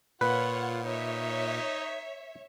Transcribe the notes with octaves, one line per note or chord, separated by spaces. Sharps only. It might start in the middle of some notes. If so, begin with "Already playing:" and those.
A#2 F4 B4 C#5 F#5
D#4 C#5 E5